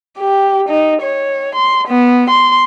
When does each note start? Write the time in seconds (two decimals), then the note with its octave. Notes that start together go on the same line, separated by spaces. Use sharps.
0.18 G4
0.69 D#4
1.02 C#5
1.55 C6
1.88 B3
2.30 C6